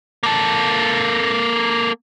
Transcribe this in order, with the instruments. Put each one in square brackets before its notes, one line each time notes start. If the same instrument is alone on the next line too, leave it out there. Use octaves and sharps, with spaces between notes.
[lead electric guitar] A#3 A4